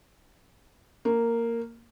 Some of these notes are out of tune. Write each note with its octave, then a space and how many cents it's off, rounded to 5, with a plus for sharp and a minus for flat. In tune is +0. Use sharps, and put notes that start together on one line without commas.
A#3 -10